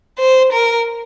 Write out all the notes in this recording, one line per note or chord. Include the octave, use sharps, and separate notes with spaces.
C5
A#4